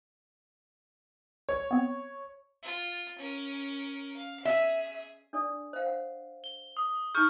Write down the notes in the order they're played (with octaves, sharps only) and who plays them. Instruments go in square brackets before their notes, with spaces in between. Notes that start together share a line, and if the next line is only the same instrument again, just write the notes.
[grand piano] C#5
[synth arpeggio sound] B3 C4
[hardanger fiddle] F4
C#4 A#4
F5
[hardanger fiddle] G#4 [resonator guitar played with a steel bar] E5
[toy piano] D4 A4 D5
C5 F5
F#5
[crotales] G7
D#6
[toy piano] D#4 G#4 [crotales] C#6 F6 G6